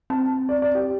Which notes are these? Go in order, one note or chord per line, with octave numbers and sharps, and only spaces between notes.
C4 A5
D5
D5
G4